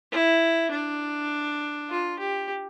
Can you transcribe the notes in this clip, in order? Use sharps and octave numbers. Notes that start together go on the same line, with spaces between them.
E4
D4
F4
G4